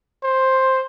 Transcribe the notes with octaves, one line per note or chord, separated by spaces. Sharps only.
C5